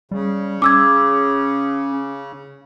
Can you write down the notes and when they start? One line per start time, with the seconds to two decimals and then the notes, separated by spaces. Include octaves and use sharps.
0.11 C#3 G3
0.62 C#4 D6 E6 G#6